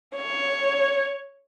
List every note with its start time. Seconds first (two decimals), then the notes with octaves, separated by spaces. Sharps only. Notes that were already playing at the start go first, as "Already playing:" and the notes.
0.15 C#5